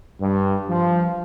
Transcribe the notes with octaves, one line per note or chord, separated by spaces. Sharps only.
G2
F3